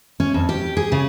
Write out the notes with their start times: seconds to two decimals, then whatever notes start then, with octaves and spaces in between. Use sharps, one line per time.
0.20 C#4
0.34 F2
0.49 G4
0.77 G#4
0.92 C#3